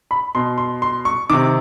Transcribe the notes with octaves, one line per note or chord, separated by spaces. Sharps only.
B5
B2 C6
C6
C6
C#6
C3 D#3 D6